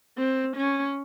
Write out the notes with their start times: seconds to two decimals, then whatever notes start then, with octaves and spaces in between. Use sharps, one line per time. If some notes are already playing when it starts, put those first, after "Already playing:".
0.18 C4
0.57 C#4